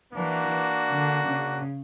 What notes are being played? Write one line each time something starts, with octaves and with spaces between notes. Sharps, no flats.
E3 A#3 D4 F#4
D3
C#3